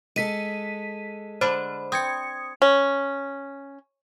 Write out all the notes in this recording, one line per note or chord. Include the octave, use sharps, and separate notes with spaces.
G#3 A4 B6 D#7
D3 D4 C5 B5
C4 D#6 G#6 C#7
C#4